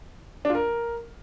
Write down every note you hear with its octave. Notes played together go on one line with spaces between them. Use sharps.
D4
F4
A#4